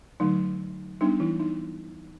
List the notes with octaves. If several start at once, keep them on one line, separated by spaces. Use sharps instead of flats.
D3 F#3 A3 D#4
G3 B3 D4 D#4
E3 E4
D#4